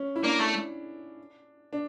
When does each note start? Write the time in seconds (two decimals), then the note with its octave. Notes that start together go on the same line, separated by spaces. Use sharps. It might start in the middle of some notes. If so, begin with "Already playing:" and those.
Already playing: C#4
0.16 E4
0.23 A#3 D4
0.40 A3
1.73 D4